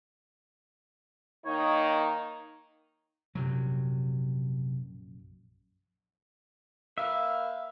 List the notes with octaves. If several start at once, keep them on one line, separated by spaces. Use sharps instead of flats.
D#3 A#3 D#4 C#5
A#1 F#2 C3 F#3
A#3 B4 E5 F5